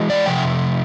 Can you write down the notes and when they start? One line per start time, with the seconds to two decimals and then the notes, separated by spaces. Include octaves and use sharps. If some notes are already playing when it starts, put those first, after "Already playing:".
Already playing: E3 G#3
0.10 D5
0.26 C3 F3 A3 G5